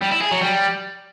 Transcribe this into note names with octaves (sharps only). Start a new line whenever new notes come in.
G3
E4
G#4
F#3
G3